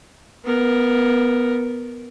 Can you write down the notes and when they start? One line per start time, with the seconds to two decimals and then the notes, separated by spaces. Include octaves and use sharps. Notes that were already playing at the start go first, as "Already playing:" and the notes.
0.45 B3 A#4